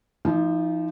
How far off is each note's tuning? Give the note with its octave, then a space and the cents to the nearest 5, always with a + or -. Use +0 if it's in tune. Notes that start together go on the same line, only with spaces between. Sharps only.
F3 -30 D#4 +15